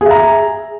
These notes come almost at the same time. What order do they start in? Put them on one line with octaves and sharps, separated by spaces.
G#4 E5 A#5